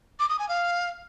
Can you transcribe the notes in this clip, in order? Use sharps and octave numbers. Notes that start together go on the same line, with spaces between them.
D6
D#6
G#5
F5